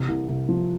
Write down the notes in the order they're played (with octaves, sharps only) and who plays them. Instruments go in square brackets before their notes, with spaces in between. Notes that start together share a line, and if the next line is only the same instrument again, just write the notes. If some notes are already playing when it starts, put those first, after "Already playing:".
Already playing: [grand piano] C3 E3
C2
C2
F3